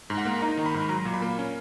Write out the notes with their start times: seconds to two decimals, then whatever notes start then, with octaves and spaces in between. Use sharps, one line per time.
0.10 G#2
0.18 F#5
0.25 A#3
0.41 D#4 A#5
0.57 D#3
0.66 B5
0.74 G#2
0.89 F#3 A#5
1.05 A#2
1.14 B5
1.22 A#3
1.39 C#4